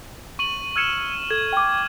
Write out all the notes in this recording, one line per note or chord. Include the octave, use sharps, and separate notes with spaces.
C#6 D#7 F#7
E6 F6 G#6 C#7 E7
A4 G#6
G5 D6